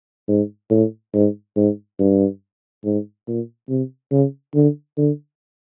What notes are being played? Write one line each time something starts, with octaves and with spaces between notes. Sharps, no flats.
G#2
A2
G#2
G#2
G2
G#2
A#2
C3
C#3
D3
D3